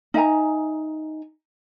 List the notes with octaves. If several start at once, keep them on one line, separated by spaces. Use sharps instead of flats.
D#4 E5 G#5 A#5